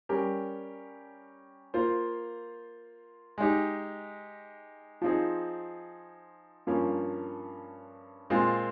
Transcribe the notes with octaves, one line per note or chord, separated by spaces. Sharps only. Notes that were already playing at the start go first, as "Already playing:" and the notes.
G3 C#4 G4 A#4
A#3 F4 C5
G#3 D#4 G4
F3 C4 D#4 G#4
G2 F3 A#3 C#4
A#2 G#3 C4 F4